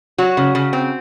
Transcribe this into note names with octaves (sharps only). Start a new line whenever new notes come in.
F#3 F#4
C#3
C#3
C4